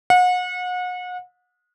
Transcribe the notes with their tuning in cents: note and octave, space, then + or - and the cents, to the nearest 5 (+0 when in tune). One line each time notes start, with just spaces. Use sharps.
F#5 -35